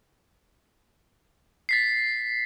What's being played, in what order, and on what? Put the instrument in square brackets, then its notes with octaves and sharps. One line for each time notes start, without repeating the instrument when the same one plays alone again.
[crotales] A6 B6 C7